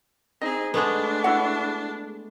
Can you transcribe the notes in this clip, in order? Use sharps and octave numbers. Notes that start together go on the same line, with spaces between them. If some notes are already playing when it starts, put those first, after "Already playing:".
C4 D#4 G#4 D#5
G#3 A3 B3 D4
E4 F#4 F#5